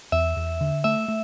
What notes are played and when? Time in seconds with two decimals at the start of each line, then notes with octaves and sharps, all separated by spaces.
0.12 E2 E5
0.36 E2
0.61 D3
0.84 A3 E5
1.08 A3